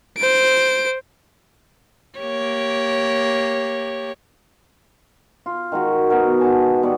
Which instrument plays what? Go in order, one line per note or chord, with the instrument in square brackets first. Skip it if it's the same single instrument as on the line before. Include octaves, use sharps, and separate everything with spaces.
[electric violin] C5 D7
[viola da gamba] A#3 G4 C#5
[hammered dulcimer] F4
D#3 G#3 F#4
B3 F#4 A#4
G#2 F#5 G#5 A5
G3 B3 D5 C#6